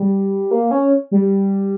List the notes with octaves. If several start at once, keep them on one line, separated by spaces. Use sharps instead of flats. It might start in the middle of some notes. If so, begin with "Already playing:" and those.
Already playing: G3
A#3
C#4
G3